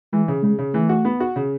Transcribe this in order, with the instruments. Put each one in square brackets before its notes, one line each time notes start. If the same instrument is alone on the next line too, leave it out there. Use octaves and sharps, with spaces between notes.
[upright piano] E3 [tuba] G#3
[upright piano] C#3
[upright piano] C#3 [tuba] G#3
[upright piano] C#3
[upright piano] E3 [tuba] A3
[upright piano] F#4
B3
F#4
C#3